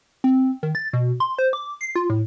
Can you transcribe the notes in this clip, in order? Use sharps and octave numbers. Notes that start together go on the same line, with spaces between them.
C4
D#3
A6
B2
C6
C5
D6
C7
F4
A2